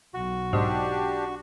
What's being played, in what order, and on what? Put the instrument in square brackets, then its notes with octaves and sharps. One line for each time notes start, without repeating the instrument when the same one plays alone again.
[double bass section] B1 [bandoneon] F#4
[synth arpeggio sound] G#2 [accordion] D4 G4